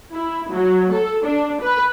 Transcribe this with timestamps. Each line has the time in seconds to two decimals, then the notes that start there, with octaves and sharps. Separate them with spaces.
0.13 E4
0.51 F#3
0.93 A4
1.26 D4
1.61 B4